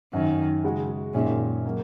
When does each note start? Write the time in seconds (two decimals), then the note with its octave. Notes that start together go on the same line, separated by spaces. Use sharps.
0.13 F#2 D#3 F#3 C#4
0.64 C#3 G#3 F#4
1.14 F#2 A#2 D#3 G#3 C#4 G#4
1.65 C#3 F#3 A#3 C#4